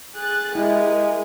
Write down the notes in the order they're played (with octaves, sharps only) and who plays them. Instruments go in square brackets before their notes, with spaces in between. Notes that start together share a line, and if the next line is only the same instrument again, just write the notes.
[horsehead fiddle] G#4 [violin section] F#6 A6
[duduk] G#3 [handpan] E4 [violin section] G4 A#4